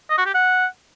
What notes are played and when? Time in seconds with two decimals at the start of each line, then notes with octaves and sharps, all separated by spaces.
0.10 D#5
0.18 F#4
0.26 G4
0.34 F#5